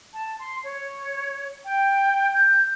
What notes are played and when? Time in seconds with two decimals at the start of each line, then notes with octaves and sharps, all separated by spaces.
0.13 A5
0.39 C6
0.63 C#5
1.65 G5
2.33 G6